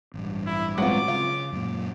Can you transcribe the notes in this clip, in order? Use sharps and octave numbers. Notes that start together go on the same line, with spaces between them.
A1 G2
E4
F#3 G#3 B3 C4 F4 D6
C#3 F4
F#2 A#2